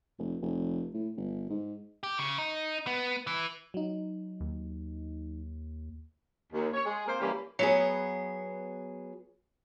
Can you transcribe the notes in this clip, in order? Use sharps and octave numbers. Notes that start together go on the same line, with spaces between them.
F1
F1
A2
G1
G#2
G4
C#3
D#4
B3
E3
F#3 D#4
D#2
D#2
C#5
G#3 G#4
A#3 C4 F4 A#4 C5
E3 G3 A#3 C#4 E4 G4
F#3 B3 G#4